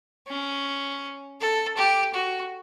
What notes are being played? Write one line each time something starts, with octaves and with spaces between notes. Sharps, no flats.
C#4
A4
G4
F#4